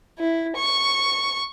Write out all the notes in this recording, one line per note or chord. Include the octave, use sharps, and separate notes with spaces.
E4
C#6